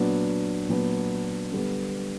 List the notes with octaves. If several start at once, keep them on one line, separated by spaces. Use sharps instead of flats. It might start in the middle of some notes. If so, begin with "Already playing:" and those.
Already playing: A#2 F#3 B3 D4
A#2 F#3 B3 D4
D3 G3 B3